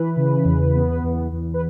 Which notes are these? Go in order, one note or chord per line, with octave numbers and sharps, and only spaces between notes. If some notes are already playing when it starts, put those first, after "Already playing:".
Already playing: E3 B4
C#3
E2
B3
E2
E2
B4